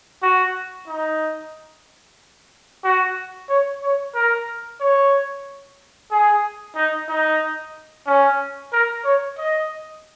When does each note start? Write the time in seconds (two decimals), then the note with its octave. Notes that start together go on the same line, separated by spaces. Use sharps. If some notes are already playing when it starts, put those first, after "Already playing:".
0.23 F#4
0.88 D#4
2.84 F#4
3.49 C#5
3.83 C#5
4.15 A#4
4.81 C#5
6.11 G#4
6.75 D#4
7.09 D#4
8.07 C#4
8.73 A#4
9.05 C#5
9.38 D#5